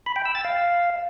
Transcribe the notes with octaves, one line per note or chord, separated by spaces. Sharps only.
B5
G5
E6
A6
F5